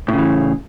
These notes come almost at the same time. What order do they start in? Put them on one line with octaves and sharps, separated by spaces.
A2 C#3 E3